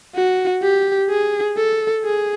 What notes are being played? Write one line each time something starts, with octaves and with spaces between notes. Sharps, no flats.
F#4
G4
G#4
A4
G#4